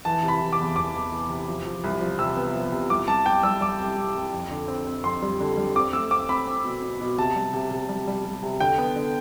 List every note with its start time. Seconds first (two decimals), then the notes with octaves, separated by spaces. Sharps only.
0.05 E3 A5
0.23 C3
0.28 B5
0.41 E3
0.53 D6
0.59 E2
0.76 E2 D6
0.95 E2
1.12 E3
1.30 C3
1.48 F3
1.66 F3
1.84 C2
2.01 F3
2.19 C3 E6
2.36 B3
2.54 F3
2.72 C3
2.90 C2 D6
3.08 C2 A5
3.26 C2 G5
3.43 G3 E6
3.61 G3 D6
3.80 C2
3.97 C2
4.15 C2
4.33 F2
4.51 D3
4.68 C4
4.87 C4
5.04 F2 C6
5.22 G3
5.40 D3
5.57 G3
5.75 C4 D6
5.93 A3 E6
6.11 C4 D6
6.29 C4 B5
6.47 C4
6.64 B2
6.82 B2
7.01 B2
7.18 C3 A5
7.35 G3
7.54 C3
7.71 C3
7.89 G3
8.07 G3
8.25 G3
8.43 C3
8.60 D3 G5
8.78 B3
8.96 D3